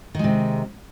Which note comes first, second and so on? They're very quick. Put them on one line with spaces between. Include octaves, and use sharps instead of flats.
D#3 G#3 C3